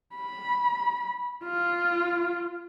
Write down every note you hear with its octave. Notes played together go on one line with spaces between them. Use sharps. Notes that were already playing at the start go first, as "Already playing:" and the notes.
B5
F4